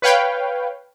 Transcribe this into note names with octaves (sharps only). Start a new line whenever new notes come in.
B4 C#5 F5 G5